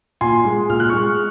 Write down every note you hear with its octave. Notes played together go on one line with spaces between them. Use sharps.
A#2 G#5 C6
G#3
A#2 F6
F#6
G#3 C#6 F6